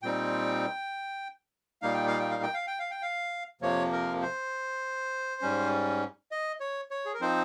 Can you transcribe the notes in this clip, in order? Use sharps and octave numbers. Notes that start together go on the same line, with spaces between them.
A#2 G3 C4 D#4 G5
A#2 G3 A#3 D#4 F5
G5
F5
G5
F5
G5
F5
G5
F5
G5
F5
F2 C3 F3 A#3 C#5
A#4
C5
G#2 G3 C#4
D#5
C#5
C#5
G#4
A#4
F3 C4 D#4 C5